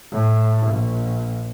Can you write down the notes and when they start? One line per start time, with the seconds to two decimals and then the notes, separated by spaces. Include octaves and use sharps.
0.11 A2
0.67 A#1